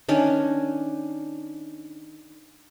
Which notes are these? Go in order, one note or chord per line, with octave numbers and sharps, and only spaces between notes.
D#3 C#4 D4 G#5